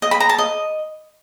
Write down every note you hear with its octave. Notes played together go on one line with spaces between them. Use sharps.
D#5
B5
A#5
A5
D#5